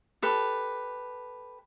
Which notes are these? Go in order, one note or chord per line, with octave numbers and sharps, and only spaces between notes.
G4 A4 B4